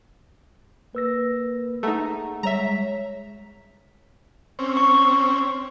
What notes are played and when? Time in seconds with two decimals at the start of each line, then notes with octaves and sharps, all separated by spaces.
0.95 A#3 B4 E6 A#6
1.83 A3 D#4 G#4 F#5 A#5
2.43 G3 G#3 C#5 E5 A#5 B6
4.59 C4 C#4
4.77 C#6